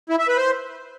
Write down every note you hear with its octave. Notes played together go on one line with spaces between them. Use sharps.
E4
E5
B4
C5